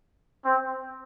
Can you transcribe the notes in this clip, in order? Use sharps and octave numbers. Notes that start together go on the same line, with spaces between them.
C4